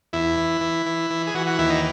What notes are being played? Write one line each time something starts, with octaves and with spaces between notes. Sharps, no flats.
E2 E4
E3
E3
E3
E3
G#4
E3 F#4
F#4
D#2 E4
D#4